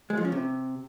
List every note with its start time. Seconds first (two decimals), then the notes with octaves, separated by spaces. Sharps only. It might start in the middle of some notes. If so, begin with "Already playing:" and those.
0.10 G#3
0.17 F3
0.25 C#4
0.32 C3